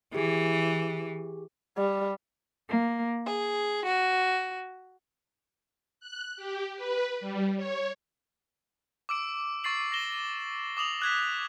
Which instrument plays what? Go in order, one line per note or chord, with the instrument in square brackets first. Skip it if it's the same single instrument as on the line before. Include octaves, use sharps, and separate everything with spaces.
[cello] E3 [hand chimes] G4 G#4
[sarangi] G3
[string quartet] A#3
G#4
F#4
[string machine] F#6
G4
B4
G3
C#5
[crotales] D6 E6 D7
C#6 A6 C7 F#7
A#6 E7 G7
D6 D#6 F7 F#7
F#6 G#6 B6